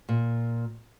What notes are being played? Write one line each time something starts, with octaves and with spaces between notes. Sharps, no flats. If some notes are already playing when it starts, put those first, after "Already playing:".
A#2